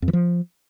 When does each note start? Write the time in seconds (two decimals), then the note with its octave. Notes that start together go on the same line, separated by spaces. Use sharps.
0.02 F2
0.08 E3
0.13 F3